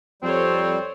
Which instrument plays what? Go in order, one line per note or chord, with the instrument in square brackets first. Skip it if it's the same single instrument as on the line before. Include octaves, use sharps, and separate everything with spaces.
[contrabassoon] F2 [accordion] G3 [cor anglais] C4 [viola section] A4 C5 C#5